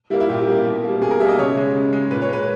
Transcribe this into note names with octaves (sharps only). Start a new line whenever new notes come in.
G3 A#3 E4
E4
A#2 G4
G3 A#3
B2
G3 A#3
B2 G#4
A#4
G3 A#3 E5
D#5
C#3 C#5
G#3
C#3
G#3
A#2 B4
C#5
G#3 B4